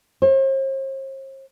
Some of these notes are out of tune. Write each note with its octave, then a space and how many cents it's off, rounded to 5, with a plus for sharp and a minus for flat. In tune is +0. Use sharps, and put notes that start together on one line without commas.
C5 +45